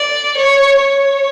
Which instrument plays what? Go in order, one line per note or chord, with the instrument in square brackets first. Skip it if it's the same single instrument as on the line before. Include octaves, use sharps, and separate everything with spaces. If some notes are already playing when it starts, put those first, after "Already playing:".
Already playing: [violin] D5
C#5
C#5